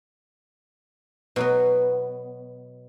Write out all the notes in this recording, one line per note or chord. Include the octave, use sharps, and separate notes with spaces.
B2 F#3 B3